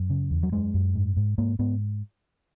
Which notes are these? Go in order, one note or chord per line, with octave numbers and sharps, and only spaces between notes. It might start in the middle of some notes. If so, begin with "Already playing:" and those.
Already playing: F#2
C#3
E2
F#3
F#2 G#3
F#2
G#2
G#2
G#2 A#3
G#2 B3